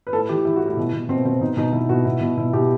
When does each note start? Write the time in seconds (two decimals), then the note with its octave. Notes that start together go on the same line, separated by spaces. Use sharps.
0.07 B4
0.13 A2 A4
0.29 E3 G4
0.45 E3 E4
0.56 A2 F#4
0.68 E4
0.77 B2
0.93 B2
1.09 B2 C4
1.25 B2 C4
1.41 B2 D#4
1.57 B2 D#4
1.73 B2 E4
1.89 B2 F#4
2.05 B2 E4
2.21 B2
2.37 B2 E4
2.53 B2 G4